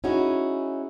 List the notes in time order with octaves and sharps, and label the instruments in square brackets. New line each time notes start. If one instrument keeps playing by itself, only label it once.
[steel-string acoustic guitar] C#4 D#4 E4 F#4 G#4